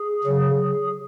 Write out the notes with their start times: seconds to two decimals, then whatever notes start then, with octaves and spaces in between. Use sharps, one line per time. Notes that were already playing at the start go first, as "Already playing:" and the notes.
Already playing: G#4
0.24 C#3 F#3